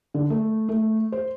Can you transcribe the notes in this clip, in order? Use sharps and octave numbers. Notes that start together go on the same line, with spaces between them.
D3
A3
A3
C5